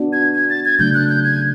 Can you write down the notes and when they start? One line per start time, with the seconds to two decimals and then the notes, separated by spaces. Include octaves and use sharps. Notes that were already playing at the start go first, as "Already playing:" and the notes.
Already playing: B3 D4 F#4
0.13 G#6
0.34 G#6
0.50 A6
0.65 G#6
0.79 C#3 F#3 A3 D4 G6
0.94 F#6
1.09 G6
1.24 G#6